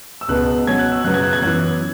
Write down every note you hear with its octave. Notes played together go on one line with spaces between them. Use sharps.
E6
C#2 B2 B3 F#6
B2 F#3 C#4 G#6
F#6
E6
F#2 C#3 F#3 B3 F#6
G#6
F#6
G#6
F#2 E3 B3 F#6